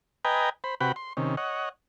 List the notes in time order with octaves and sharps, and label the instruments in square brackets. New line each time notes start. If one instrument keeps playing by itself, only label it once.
[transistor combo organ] B4 D#5 G5 G#5 A#5
C5 B5
C3 F#4 B4 F#5 G5 B5
C6
C3 D#3 C#4
C#5 D#5 F#5